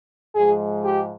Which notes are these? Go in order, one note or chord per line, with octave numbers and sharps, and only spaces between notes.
G#2 F3 G#3 G#4
G4